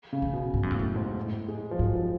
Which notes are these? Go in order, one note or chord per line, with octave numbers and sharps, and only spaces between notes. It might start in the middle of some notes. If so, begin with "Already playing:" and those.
C#3
F2
B2
G#2
F#2
F2
F#2 A2
G#2
A2
G#3
F3
G#2 F#3
F3